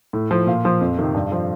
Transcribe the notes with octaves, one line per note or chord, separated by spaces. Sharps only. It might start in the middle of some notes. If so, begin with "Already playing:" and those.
A2
F3
A#2 F5
F3
F2
C3 D#3
G2
F3